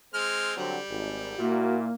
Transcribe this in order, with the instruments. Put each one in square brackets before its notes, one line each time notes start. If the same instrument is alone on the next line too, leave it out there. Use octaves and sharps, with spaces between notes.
[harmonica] G#3 C4 F6
[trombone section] D3 F#3 C4 [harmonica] G3
[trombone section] G#1
[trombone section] A#2 E4 [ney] A#3 [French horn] F#4